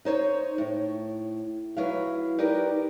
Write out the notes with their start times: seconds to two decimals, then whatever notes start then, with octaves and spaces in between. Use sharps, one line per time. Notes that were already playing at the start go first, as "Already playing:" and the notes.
0.05 D#4 C5 C#5 D#5
0.58 A2
1.77 F#3 E4 B4 F5
2.39 D#4 G4 A#4 B4 D5